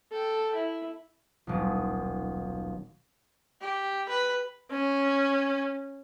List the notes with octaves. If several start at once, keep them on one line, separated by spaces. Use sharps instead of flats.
A4 G5
E4
D#1 B1
G4
B4
C#4